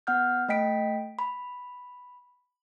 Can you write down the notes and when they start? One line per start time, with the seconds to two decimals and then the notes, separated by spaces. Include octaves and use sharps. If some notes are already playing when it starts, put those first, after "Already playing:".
0.07 B3 F#5 F6 G6
0.49 A3 D#5 G5 B6 D7
1.19 B5